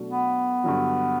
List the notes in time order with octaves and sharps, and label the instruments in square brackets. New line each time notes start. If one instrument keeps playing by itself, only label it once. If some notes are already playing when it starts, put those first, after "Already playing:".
Already playing: [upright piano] B2 F#3 A3 D4 F#4
[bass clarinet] B3
[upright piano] G2 D3 F#3